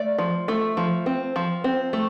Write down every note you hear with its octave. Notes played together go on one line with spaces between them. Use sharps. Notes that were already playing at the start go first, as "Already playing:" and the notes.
Already playing: A3 D5
F3
A3
F3
C4
F3
C4
A3